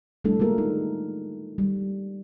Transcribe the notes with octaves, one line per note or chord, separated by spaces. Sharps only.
G3 A3 D4 E4 A4
G#3 A#3 F4 A#4
D#4
G3